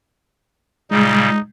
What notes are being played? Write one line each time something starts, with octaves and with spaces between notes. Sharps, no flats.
A#2 C#3 G3 G#3 D#4